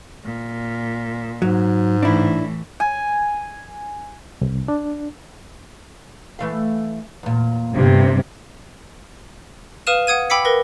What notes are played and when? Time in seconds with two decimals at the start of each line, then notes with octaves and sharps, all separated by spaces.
0.24 A#2
1.42 G#2 F#3
2.03 A2 E3 D4 E4
2.80 G#5
4.41 C2
4.68 D4
6.39 E3 A3 F5
7.23 E2 A#2
7.74 G1 G2 C3
9.87 B4 F5 D#6 F6 D#7 E7
10.07 F#5 D#6 G#6 D#7
10.30 G5 B5 D6 E6 B6 C#7
10.45 A#4 B4 A#6